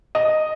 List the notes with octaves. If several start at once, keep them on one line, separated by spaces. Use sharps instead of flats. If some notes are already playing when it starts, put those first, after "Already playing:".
D#5